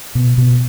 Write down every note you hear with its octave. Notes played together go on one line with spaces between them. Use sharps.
B2
B2